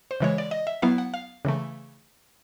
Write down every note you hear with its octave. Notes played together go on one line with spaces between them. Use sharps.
C5
C#3 E3 G#3 C#5
D5
D#5
E5
F#3 B3 E4 F5
F#5
F5
C#3 E3 A3